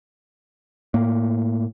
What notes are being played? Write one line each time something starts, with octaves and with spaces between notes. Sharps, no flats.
A2 A#3